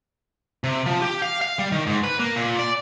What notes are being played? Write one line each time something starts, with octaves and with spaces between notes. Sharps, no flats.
C3
F3
G4
F5
F5
G3
D#3
G#2
B4
A#3
A#2
D5